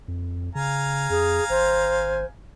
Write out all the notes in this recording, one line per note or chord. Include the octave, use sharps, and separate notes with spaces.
F2
C#3 F5 G#5 A#5
F2 G#4
G#1 C5